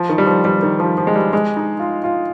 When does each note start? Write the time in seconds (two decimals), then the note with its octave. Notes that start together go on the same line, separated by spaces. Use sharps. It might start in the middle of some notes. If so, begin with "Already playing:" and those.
Already playing: F3
0.09 D#3
0.18 G3
0.26 F3
0.45 G3
0.62 D#3
0.80 F3
0.98 F3
1.07 G#3
1.15 G3
1.33 G#3
1.57 D#4
1.80 F4
2.04 F4